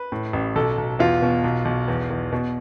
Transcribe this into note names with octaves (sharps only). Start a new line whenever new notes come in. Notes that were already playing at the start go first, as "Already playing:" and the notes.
Already playing: B4
A2
A1
B1 A4
B1
E2 F4
B2
B1
B1
E2
E2
B2